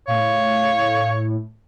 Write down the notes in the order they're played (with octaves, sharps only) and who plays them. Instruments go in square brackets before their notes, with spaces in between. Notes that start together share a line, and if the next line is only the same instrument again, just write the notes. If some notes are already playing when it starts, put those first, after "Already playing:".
[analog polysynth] A2 [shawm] C#5 [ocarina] F5